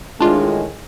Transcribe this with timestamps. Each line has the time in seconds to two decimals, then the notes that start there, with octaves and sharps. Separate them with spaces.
0.21 A2 D#3 G#3 D4 F4